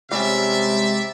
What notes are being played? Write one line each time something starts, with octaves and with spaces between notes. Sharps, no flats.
C3 G3 G#3 C#4 D5 E5